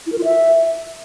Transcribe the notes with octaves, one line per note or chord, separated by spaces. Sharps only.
E4
A#4
F4
E5